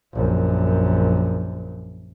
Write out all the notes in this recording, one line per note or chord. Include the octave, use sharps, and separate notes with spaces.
A#1 F#2